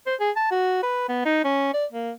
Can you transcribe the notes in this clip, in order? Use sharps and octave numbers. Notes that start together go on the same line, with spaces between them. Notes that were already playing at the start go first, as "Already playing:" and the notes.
C5
G#4
A5
F#4
B4
B3
D#4
C#4
D5
A#3